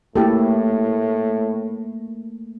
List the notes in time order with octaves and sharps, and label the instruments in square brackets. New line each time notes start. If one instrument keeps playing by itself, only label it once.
[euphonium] A2 [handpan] A3 A#3 [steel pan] E4 G4 A4